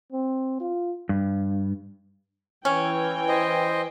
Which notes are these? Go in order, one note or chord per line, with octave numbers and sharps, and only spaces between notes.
C4
F4
G2
E3 C#4 G5 G#5
C5 D#5